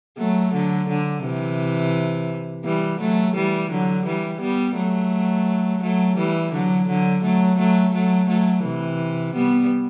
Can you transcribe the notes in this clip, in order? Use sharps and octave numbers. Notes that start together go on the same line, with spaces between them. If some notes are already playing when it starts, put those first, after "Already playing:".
F#3 A3
D3 F#3
D3
C3 E3
E3 G3
F#3 A3
E3 G3
D3 F#3
E3 G3
G3 B3
F#3 A3
F#3 A3
E3 G3
D3 F#3
D3 F#3
F#3 A3
F#3 A3
F#3 A3
F#3 A3
C3 E3
G3 B3